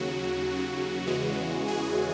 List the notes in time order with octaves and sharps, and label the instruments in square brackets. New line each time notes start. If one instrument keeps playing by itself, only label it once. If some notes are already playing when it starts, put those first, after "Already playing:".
Already playing: [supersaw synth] D#2 C#3 F#3 F#4
E2 C#3 E3 G#3
G#4